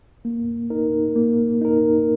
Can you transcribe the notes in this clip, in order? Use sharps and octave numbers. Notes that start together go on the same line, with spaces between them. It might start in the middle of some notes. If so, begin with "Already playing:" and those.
A#3
D#4 A#4
A#3
D#4 A#4